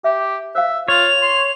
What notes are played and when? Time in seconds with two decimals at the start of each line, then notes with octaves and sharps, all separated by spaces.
0.04 G4 E5
0.55 C5 E5 F5
0.88 F4 C#5 F7
1.22 C6